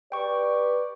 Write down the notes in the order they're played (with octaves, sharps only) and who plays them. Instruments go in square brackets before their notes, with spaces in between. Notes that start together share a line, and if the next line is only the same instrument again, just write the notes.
[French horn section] G4 B4 D5 [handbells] G5 C#6